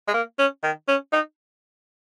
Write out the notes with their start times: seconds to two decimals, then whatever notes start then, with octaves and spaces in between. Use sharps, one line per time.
0.08 G#3
0.14 A#3
0.39 C#4
0.63 D#3
0.88 C#4
1.13 D#4